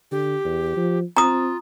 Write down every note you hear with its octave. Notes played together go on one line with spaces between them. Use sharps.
D3 G4
E2
F3
C4 F4 A#5 D#6